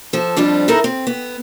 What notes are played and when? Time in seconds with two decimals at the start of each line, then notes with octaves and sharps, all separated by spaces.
0.13 F3 A4
0.36 F2 F3 G3 D4
0.68 D#4 E4 A4 A#4
0.84 C4
1.07 B3